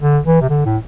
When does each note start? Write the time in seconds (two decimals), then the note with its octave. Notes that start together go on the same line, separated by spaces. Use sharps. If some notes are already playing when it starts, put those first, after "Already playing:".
0.02 D3
0.25 E3
0.41 C3
0.50 D3
0.66 A2